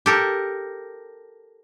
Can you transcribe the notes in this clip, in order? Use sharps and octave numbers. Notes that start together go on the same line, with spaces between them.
G4 A4 A#4